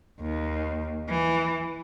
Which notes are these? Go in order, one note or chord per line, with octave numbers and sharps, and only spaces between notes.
D#2
E3